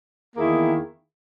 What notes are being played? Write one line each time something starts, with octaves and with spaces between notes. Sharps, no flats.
E2 D#3 A#3 E4 G#4